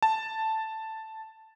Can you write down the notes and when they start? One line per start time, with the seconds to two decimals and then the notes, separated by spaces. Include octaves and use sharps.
0.02 A5